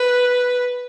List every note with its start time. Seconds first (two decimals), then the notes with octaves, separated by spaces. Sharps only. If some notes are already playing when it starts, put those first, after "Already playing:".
Already playing: B4